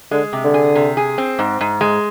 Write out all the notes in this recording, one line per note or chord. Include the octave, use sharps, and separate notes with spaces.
D3 G#3
C3
D3
G#4
C3
G#4
C4
G#2
G#2
G#3